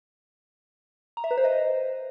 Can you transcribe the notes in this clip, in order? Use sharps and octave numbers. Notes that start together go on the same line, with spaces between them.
A#5
E5
B4
C5
D#5